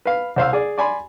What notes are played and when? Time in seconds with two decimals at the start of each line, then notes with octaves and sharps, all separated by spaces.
0.05 B4 F5
0.36 C2 C5 F5 E6
0.53 G#4 D5
0.78 D5 G#5 B5 C6